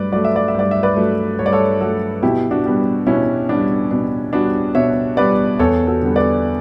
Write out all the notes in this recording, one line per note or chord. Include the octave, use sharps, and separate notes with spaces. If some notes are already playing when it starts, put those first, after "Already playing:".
Already playing: G2 F#3 A3 B4 D5
F#3 A3 D5
E5
D5
E5
G2 D5
E5
B4 D5
F#3 A3
G2 C#5
D5
A4 C#5
F#3 A3 F#4 A4
B2 E4 G4
D4 F#4
G3 B3
B2 C#4 E4
G3 B3 D4
B2 D4
G3 B3 D4 F#4
B2 C#5 E5
G3 B3 B4 D5
E2 A4 C#5
F#4 A4
D3 G3 B3
B4 D5